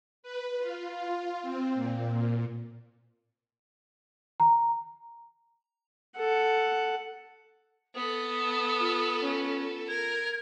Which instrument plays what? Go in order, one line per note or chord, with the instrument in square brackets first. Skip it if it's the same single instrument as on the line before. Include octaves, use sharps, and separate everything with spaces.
[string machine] B4
F4
F4
C4
A#2
[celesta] A#5
[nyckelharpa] A4 F#5
[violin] B3 A4 [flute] D#6
[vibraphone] F4
[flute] C#4
[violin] A#4 [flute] G#6